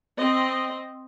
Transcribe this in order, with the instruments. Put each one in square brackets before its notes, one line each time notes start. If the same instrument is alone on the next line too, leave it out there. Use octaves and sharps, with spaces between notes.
[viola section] C4 D#5